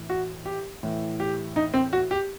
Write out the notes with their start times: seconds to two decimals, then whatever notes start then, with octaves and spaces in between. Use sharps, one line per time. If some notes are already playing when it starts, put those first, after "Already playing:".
Already playing: A2 E3
0.09 F#4
0.46 G4
0.83 A2 E3
1.20 G4
1.56 D#4
1.74 C4
1.93 F#4
2.11 G4